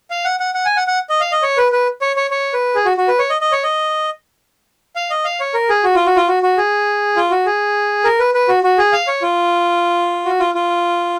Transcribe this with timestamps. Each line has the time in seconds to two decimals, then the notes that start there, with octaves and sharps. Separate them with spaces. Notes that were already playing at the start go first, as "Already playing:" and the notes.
0.10 F5
0.25 F#5
0.40 F#5
0.54 F#5
0.65 G#5
0.77 F#5
0.87 F#5
1.09 D#5
1.21 F5
1.32 D#5
1.43 C#5
1.57 B4
1.72 B4
2.01 C#5
2.16 C#5
2.31 C#5
2.53 B4
2.75 G#4
2.86 F#4
2.97 F#4
3.08 B4
3.19 C#5
3.30 D#5
3.41 D#5
3.52 C#5
3.63 D#5
4.96 F5
5.10 D#5
5.25 F5
5.40 C#5
5.54 A#4
5.69 G#4
5.84 F#4
5.95 F4
6.06 F#4
6.17 F4
6.28 F#4
6.43 F#4
6.58 G#4
7.16 F4
7.31 F#4
7.46 G#4
8.04 A#4
8.19 B4
8.34 B4
8.48 F#4
8.63 F#4
8.78 G#4
8.92 F5
9.07 C#5
9.22 F4
10.25 F#4
10.40 F4
10.55 F4